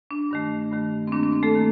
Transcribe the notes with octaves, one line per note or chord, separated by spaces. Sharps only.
D4
G2 D#3 A3
G2 D#3 A3
C4
G2 D#3 A#3 D4
D4
C4
A3 A4
D#3 A#3